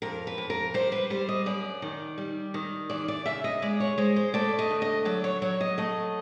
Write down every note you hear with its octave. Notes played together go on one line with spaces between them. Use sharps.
F2 A#4
B4
F2
A#4
G3 C5
B4
G3 C5
D#5
F#2 D5
D#3
G3
D#3
E3 D5
D5
C#3 E5
D#5
G#3 D5
C#5
G#3 C5
C5
A3 D5
D#5
D2
D#5
F#3 D5
C#5
F#3 C#5
D#5
A3 D#5